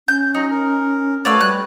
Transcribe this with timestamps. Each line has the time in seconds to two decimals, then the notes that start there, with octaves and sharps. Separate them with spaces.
0.08 C#4 G6
0.35 F#3 D#4 D#5
0.51 A#4
1.25 A3 F#4 B4 C#5 D5 F5 E6
1.41 G3 F#6